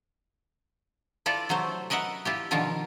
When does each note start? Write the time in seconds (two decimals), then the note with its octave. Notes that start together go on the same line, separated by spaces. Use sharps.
1.26 E4 F4 A4 D5
1.49 C3 F#3 A3 C5
1.90 A#4 B4 D#5 E5 F#5
2.25 E4 F4 G4
2.51 B2 D3 D#3 F3 F4 A#4